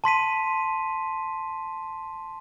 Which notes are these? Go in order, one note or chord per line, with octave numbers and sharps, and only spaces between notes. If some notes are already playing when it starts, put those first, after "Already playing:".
A5 C6 B6 D#7